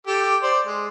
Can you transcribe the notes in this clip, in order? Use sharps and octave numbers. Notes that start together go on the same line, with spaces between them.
G4 A4 D6
C5 D5
G#3